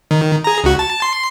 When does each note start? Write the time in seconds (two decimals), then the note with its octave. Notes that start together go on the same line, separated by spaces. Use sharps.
0.11 D#3
0.44 G#4 A#5
0.64 C#2 F#4
0.79 A5
1.02 C6